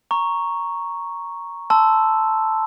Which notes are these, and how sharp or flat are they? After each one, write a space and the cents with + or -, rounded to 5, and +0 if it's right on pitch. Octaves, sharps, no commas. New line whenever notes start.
A#5 +0 C#6 +0
A5 +0 C6 -15 E6 +0